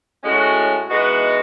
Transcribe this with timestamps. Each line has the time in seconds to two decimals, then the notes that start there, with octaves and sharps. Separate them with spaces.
0.24 A2 G#3 C#4 F#4
0.90 E3 G#3 B3 D#4 F#4